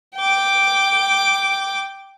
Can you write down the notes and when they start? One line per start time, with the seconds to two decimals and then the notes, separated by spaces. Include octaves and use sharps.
0.16 G5 D6